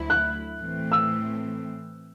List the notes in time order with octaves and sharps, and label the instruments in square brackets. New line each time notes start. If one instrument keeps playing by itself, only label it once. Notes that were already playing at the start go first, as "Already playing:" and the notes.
Already playing: [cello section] D2 D3 F#3 A3 E4
[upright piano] F#6
[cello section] A2 E3 A3 C4
[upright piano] E6